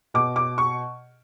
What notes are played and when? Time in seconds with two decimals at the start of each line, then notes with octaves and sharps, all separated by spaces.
0.14 B2 D6
0.36 D6
0.58 C#6